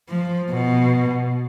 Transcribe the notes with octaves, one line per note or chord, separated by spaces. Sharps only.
F3
B2